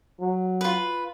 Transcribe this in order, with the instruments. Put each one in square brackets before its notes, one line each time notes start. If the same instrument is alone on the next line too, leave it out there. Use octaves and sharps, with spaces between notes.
[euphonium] F#3
[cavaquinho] F4 B4